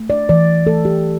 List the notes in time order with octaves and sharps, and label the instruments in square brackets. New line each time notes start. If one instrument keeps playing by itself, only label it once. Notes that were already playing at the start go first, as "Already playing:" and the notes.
Already playing: [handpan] A3
D5
E3 D5
A3 A4
G4